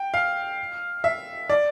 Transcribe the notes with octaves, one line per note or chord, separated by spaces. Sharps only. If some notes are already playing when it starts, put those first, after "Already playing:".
Already playing: G5
F5
E5
D5